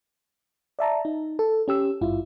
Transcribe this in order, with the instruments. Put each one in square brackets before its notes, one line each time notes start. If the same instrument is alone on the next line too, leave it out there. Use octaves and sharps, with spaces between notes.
[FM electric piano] D5 E5 A5 A#5
D#4
A4
C#4 G4 E6
G#1 G2 E4 F4